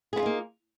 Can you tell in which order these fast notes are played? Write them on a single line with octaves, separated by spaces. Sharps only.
G#4 B3 F4 D#4 A#3